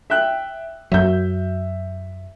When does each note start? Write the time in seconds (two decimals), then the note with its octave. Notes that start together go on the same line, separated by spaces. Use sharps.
0.10 E5 G5 F#6
0.92 F#2 F#3 E5 G6